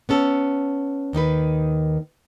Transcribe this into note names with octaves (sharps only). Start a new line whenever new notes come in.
B3 C#4 A4
D#2 D#3 D#4 B4